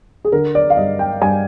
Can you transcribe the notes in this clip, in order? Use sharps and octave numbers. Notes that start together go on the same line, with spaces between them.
G#4
D3 A#4
D5
F5
G2 D#5
G5
G2 G#5